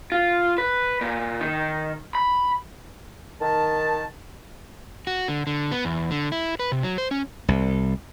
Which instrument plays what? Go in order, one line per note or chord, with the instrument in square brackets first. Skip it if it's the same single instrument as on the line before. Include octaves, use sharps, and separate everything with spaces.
[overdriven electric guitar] F4
B4
A#2
D#3
B5
[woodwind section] D#3 A5
[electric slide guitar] F#4
D3
D3
B3
E2
D3
E4
B4
C3
F#3
C5
C#4
[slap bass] C2